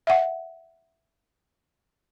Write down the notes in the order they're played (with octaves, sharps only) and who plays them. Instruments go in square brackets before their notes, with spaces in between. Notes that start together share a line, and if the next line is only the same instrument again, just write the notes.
[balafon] E5 F#5